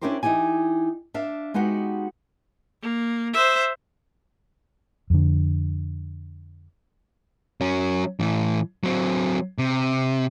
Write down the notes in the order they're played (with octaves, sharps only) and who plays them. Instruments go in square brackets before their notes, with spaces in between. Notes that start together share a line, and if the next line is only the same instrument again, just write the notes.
[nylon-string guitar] C#4 D4 E4 G4 A#4 C5
E3 D#4 E4 G4 G#5
D4 E5 F5
G#3 B3 D#4 F#4 G4
[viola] A#3
C5 E5
[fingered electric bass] F2 D3
[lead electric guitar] F#3 C#4
A2 E3
F#3 C4
C3